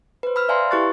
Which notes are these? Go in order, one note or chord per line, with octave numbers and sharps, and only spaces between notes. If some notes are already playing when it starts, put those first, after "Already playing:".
B4 C5
B5 E6 F6
D5 E5 F5 G#5 A#5 C6
E4 G4 B4 C#6 F#6 A6